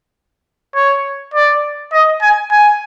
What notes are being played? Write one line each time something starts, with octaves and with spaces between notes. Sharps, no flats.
C#5
D5
D#5
G#5
G#5